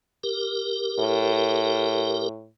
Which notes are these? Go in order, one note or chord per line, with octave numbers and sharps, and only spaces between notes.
G4 A#4
A2